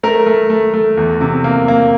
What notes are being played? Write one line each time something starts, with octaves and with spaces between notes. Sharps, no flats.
A3 A#4
A3
A3
A3
E2
C3
A#3
A#3